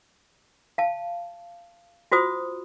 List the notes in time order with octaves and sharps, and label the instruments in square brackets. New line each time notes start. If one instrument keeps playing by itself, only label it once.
[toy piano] F5 A5
F4 F#4 C5 D#6